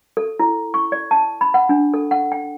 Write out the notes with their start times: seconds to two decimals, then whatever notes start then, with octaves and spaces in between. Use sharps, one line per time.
0.17 A4
0.39 E4
0.74 C#6
0.92 D5
1.11 A5
1.41 B5
1.54 F#5
1.69 D4
1.94 A4
2.11 F#5
2.32 G5